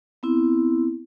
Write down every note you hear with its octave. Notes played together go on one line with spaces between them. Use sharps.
B3 C4 E4